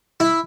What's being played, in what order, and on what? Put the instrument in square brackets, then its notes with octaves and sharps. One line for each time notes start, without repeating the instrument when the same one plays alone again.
[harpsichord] E4